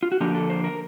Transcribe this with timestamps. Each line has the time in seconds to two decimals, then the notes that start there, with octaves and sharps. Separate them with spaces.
0.03 F4
0.12 F#4
0.21 D3 F3 A#3 D4 G4
0.35 A4
0.50 C5
0.64 A#4